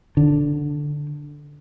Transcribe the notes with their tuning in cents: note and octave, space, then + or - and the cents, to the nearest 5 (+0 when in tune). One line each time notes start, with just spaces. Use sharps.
D3 +0